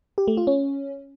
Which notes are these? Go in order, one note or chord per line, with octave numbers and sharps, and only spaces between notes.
G4
A3
F4
C#4